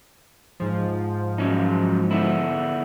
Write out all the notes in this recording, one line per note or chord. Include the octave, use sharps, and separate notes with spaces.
G#2 F3
F#3 C#4 D#4
D3 B3 E4